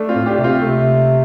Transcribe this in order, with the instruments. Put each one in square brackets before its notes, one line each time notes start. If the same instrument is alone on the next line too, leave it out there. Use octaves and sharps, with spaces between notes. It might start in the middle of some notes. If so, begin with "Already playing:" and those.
Already playing: [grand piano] A3 D4
C4 F4
[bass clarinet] A2
[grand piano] D4 G4
[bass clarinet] C3
[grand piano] C4 F4
[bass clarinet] C3 [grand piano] A3